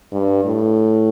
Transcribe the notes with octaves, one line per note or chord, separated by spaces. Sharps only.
G2
A2